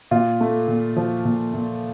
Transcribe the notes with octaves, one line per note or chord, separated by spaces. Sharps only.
A#2 F4
A3
A#2
F3
A#2
A#2